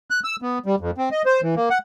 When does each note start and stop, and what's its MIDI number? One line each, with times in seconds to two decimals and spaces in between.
0.10 0.20 90
0.24 0.36 88
0.42 0.59 59
0.66 0.76 55
0.80 0.91 41
0.98 1.09 60
1.11 1.22 75
1.26 1.41 72
1.42 1.55 52
1.56 1.69 58
1.70 1.78 78